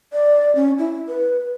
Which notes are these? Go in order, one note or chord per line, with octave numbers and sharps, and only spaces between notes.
D5
C#4
E4
B4